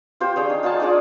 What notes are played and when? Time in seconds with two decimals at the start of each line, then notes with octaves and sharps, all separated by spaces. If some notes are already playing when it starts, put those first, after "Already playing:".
0.20 F4 G4 C5
0.36 D4 G#4 C#5
0.49 D#4
0.63 D#4 F4 G#5 A5
0.80 D4 F4 G#4 D5